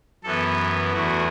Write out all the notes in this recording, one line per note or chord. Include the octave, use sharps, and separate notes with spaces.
F#2 E3 B3 A4
E2 E3 A3 F#4